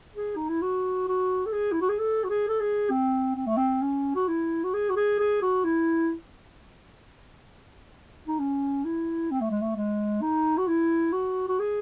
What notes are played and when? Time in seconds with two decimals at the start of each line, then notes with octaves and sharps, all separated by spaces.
0.15 G#4
0.36 D#4
0.49 E4
0.62 F#4
1.08 F#4
1.46 A4
1.53 G#4
1.72 E4
1.81 F#4
1.89 G#4
1.99 A4
2.24 F#4
2.30 G#4
2.48 A4
2.60 G#4
2.90 C4
3.36 C4
3.47 A3
3.57 C4
3.82 C#4
4.15 F#4
4.28 E4
4.64 F#4
4.74 G#4
4.90 F#4
4.96 G#4
5.19 G#4
5.42 F#4
5.64 E4
8.27 D#4
8.39 C#4
8.85 E4
9.31 C4
9.41 A3
9.51 G#3
9.61 A3
9.76 G#3
10.22 D#4
10.58 F#4
10.68 E4
11.13 F#4
11.48 F#4
11.60 G#4